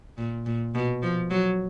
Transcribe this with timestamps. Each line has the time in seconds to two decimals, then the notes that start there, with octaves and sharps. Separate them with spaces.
0.18 A#2
0.46 A#2
0.75 B2
1.02 F3
1.30 F#3